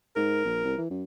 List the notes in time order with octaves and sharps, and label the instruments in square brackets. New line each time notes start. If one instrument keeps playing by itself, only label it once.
[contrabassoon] G#2 [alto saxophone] A#4
[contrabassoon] A#1
C2
E3
F#2